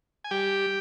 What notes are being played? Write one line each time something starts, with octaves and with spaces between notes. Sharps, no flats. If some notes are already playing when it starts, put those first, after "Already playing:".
G#5
G3 G4 G5